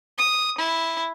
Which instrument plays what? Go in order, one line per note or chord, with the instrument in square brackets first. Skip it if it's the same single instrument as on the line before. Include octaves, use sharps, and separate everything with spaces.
[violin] D#6
E4